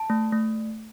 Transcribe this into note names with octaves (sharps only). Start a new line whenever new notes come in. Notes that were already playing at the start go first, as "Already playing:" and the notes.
Already playing: A5
A3
A3